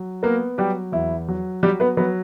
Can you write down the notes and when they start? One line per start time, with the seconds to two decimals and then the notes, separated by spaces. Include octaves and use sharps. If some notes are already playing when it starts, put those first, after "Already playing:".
Already playing: F#3
0.23 A#3 B3 A#4
0.58 F#3 G3 G4
0.92 E2 E4
1.28 F#3
1.63 F#3 G3 G4
1.80 B3 B4
1.97 F#3 B3 B4